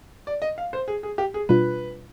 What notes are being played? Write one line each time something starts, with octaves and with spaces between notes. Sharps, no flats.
D5
D#5
F5
C5
G#4
G#4
G4
G#4
B2 G3 D4 F4 B4